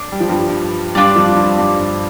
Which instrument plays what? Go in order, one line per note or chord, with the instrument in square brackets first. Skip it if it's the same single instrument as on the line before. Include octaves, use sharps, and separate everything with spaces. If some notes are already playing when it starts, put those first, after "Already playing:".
Already playing: [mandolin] D4
[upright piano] G3
F3
G2 G3
[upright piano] G2 G3 [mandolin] D4 F4 D5
[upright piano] F2 F3
G2
G2